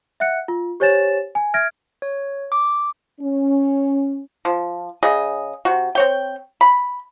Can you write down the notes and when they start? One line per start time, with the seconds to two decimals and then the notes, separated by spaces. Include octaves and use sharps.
0.20 E5 F#5 F#6 C#7
0.48 F4
0.80 G4 C5 C#5 G#5 A6 E7
1.35 G#5
1.54 E5 F6 G#6 A#6 D7
2.02 C#5
2.52 D6
3.20 C#4
4.45 F3
5.03 C#3 G#4 D#5
5.65 C3 F#4
5.95 C4 C#5 G5
6.61 B5